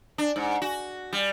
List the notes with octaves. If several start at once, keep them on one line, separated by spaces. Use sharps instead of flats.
D4
G#2
F#4
G3